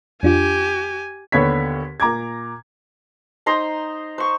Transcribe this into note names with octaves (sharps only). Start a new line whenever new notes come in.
F2 D4 F4 G4 G#5
D#2 D3 B3 C#5 G#6 B6
A#2 A#5 D6 G#6
D#4 C5 A#5 C6
C5 C#6